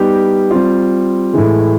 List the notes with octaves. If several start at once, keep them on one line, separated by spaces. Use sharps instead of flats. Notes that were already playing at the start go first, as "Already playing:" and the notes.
Already playing: G3 B3 D#4 G4
G3 C4 F4
A2 E3 G#3